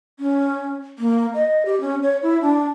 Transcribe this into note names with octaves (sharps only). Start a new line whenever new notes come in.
C#4
A#3
D#5
G4
C#4
C#5
E4
D4